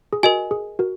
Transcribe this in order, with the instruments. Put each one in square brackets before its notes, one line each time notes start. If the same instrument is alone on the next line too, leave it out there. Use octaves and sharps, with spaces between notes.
[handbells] G#4
[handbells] F#4 [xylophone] A#4 D#5 G#5
[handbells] G#4
F#4 A#4